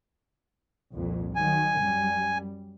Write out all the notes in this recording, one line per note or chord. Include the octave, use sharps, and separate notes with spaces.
C2 F2 A#2
D#3 F#3 G#5
F#2 G3